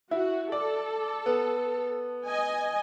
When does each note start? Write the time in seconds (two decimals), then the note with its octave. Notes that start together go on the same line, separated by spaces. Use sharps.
0.11 E4 F#4
0.52 A4 D5
1.26 B3
2.27 D#5 G#5